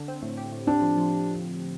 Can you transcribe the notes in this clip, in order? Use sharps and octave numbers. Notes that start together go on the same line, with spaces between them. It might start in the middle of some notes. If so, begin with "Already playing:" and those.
Already playing: D3
C4
A2
G4
A2
C4 D4
F3
F3